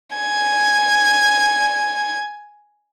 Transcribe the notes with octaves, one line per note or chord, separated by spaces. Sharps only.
G#5 G#6